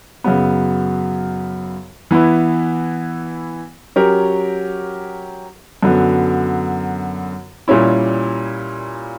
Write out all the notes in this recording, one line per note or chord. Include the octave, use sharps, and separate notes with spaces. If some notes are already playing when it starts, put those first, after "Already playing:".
F#2 C#3 F#3 B3
E3 B3 E4
F#3 C#4 G4 A#4 C#5
F#2 D3 F#3 B3
A#2 G3 C#4 E4